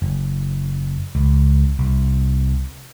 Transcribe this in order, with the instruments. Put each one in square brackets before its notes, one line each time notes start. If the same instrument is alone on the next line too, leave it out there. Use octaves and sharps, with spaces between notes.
[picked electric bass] F#1
C#2
C2